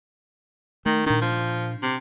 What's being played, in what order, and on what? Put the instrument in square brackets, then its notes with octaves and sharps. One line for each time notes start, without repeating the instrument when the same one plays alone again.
[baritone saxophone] D#3 [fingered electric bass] A3
[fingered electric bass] A#2 D4 [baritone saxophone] D#3
[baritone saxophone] F3
C3